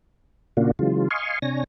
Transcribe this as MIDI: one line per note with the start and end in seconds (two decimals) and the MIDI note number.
0.57 0.71 46
0.57 0.71 49
0.57 0.71 58
0.57 0.71 62
0.57 0.71 65
0.57 0.71 66
0.79 1.08 49
0.79 1.08 52
0.79 1.08 54
0.79 1.08 56
0.79 1.08 65
1.11 1.39 75
1.11 1.39 77
1.11 1.39 80
1.11 1.39 84
1.11 1.39 85
1.42 1.64 48
1.42 1.64 62
1.42 1.64 73
1.42 1.64 80
1.42 1.64 94